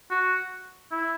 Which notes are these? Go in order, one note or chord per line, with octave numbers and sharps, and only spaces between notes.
F#4
E4